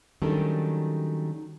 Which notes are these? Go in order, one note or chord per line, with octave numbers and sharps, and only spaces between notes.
D#3 F#3 G3 A3 C#4 D4